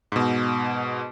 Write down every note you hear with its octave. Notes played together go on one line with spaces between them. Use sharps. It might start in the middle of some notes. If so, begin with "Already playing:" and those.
G#2 B2